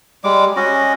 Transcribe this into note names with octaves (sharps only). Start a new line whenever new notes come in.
G3 G#3 D6
C#4 F#4 D#5